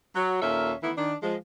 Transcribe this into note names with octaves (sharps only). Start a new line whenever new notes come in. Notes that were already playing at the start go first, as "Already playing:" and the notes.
F#3
D#2 A#2 C#4 A4 E5 F5
D#3 E3 A3 B3 E4
D#3 D4
F3 G#3